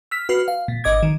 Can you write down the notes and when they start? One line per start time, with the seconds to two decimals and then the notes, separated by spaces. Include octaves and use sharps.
0.11 E6 F6 B6
0.29 F#4 B4 F6 C7
0.48 F5
0.68 A#2
0.84 G#1 D#5 D6 G#6
1.03 D#3